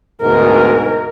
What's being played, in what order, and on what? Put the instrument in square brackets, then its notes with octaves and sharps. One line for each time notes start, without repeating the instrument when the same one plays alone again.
[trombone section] D2 G#2 B2 [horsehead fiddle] A#4